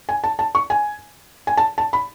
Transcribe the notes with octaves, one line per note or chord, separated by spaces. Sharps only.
G#5
A5
A5
C#6
G#5
G#5
A5
A5
B5